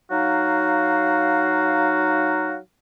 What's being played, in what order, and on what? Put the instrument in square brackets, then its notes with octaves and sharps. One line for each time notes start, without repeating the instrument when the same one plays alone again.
[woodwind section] F#3 D#4 F#4 F5